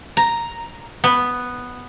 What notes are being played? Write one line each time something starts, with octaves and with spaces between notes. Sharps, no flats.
A#5
B3